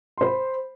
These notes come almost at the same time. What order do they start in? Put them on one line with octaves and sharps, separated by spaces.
C6 C5 B5